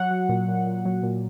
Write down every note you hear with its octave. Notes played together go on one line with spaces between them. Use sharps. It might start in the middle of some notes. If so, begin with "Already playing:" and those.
Already playing: F#3 F#5
F#3
A#2
A#2
A#2
F#3
A#2